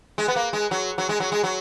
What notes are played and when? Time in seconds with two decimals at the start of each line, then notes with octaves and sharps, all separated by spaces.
0.18 G#3
0.28 B3
0.36 A#3
0.53 G#3
0.71 F#3
0.98 F#3
1.09 G#3
1.20 F#3
1.32 G#3
1.44 F#3